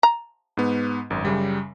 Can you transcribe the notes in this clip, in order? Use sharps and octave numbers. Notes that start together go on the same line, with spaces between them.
A#5
G#2 B3
G#1 F#2
F#2 C#3 G3